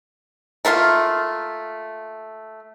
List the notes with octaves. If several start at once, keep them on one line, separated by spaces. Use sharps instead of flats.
A3 A#3 F4 F5